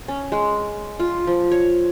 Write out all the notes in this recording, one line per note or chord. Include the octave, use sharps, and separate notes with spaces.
C#4
G#3
F4
F3
C#5